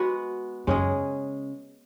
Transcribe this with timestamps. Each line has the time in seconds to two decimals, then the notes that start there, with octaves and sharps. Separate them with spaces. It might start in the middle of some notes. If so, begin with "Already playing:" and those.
Already playing: G#3 B3 F#4
0.67 F#2 C#3 G#3 C#4 G#4